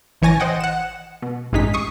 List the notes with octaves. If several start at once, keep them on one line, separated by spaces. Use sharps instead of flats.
A1 E3 C#5 G#5 A6 A#6
C5 D#5 F#5 G5
F#5 E7
B2
A1 G2 G#3 D#4 B6
C#6 D#6 C7